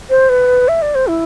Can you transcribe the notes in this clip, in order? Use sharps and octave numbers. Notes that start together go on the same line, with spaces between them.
C5
B4
E5
D5
C5
E4